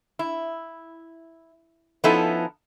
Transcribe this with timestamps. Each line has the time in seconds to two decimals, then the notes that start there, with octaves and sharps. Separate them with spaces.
0.19 E4
2.04 F3 B3 C#4 D#4 E4 A4